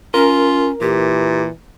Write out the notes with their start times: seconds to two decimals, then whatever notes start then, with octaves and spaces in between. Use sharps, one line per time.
0.14 C#4 F4 A#4
0.81 A#2 E3 G4